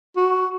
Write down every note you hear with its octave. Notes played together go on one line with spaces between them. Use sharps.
F#4